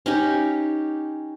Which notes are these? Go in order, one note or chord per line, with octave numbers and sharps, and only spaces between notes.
C#4 D#4 G4